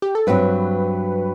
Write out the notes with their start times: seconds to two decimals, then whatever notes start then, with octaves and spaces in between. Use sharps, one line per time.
0.02 G4
0.15 A4
0.27 G2 F#3 C4 B4